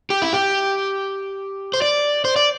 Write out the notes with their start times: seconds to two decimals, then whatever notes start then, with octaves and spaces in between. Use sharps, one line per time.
0.10 G4
0.22 E4
0.33 G4
1.74 C5
1.82 D5
2.25 C5
2.36 D5